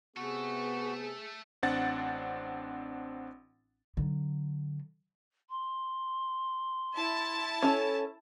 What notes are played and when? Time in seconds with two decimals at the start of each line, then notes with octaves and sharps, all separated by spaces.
0.16 C3 A3 B3 F#4 G#4 A4
1.63 A1 C4 D4 F#5 A6
3.97 D3 F#3
5.50 C6
6.96 E4 A5
7.62 C#4 A4